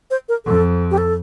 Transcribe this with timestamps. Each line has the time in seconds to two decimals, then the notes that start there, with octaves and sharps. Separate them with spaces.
0.11 C5
0.29 A#4
0.45 F2 A4
0.91 G4
0.98 A4